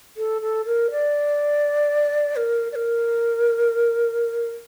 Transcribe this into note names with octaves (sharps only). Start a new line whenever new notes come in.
A4
A4
A#4
D5
A#4
D5
A#4